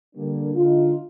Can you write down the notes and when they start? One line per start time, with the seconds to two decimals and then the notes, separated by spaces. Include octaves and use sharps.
0.15 D3 G3 A#3 D4
0.53 D3 G#3 D#4 F4